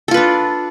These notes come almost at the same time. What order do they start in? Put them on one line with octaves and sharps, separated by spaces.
A4 F4 B4 D4